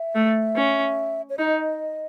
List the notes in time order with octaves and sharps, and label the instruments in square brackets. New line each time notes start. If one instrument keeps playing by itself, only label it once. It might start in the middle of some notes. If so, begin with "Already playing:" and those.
Already playing: [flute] E5
[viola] A3
C#4
[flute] C#5
[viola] D#4 [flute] D#5